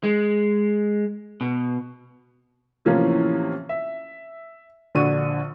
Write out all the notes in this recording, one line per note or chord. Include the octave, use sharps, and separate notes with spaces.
G#3
B2
A2 C3 E3 F3 A#3 C#4
E5
A#1 D3 D4 F#4 C#6 D#7